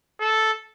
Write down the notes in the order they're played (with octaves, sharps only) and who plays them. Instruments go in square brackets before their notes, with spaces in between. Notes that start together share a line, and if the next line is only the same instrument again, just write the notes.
[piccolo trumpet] A4